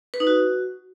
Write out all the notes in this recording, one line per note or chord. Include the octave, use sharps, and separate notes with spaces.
B4
D#4
F#4